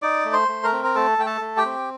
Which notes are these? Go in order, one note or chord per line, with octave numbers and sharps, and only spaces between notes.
D#4 D5 D6
A3
C5 C6
A3
A#4 A#5
C4
A#5
A3 A4 A5
A3 G5
A4 A5
A3
G4 G5
C4